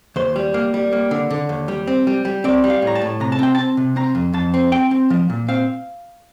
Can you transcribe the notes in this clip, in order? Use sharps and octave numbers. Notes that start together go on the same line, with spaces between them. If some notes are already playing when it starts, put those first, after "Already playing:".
D#2 C5
G3
A#3
G3
A#3
D3
D3
D#2
G3
C4
G3
G3
C4 D5
G3
F5
A2 A#5
A5
A2
C3 A#5
A5
C4 G5
C4 A5
C3
C4 A#5
F2
F2 A5
C4
C4 G5
C4
F3
A#2
C4 F5